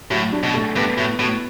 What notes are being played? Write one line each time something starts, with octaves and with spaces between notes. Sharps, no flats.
A2 F#3
D4
B2
A3
G2 B3
A2 F#4
A2 F#4